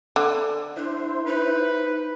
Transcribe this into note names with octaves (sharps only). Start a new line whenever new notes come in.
D3
D4 E4 C5
D#4 B4